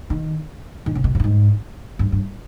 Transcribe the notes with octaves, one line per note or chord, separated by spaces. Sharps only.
D#3
D#3
C#3
B2
A2
G2
G#2
G2
G2